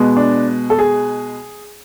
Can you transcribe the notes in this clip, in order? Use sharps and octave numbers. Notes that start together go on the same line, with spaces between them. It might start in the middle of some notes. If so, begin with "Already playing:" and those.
Already playing: B2 G#3 B3
D4
A4
G#4